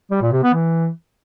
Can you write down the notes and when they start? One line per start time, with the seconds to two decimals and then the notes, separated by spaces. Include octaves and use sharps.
0.11 G3
0.22 A#2
0.33 C3
0.43 B3
0.54 E3